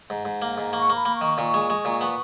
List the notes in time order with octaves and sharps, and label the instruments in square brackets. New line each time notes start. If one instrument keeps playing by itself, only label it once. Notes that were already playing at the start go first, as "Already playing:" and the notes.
[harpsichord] G#2
G#2
A#3
G#2
[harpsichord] A#3 [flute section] C#6
[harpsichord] A#3
[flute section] B5
[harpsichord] A#3
[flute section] C#6
[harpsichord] D#3
A#2
G#3
G#3
A#2
B3